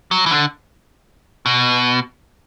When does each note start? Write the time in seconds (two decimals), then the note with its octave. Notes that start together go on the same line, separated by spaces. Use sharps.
0.11 F#3
0.26 E3
0.31 D3
1.46 B2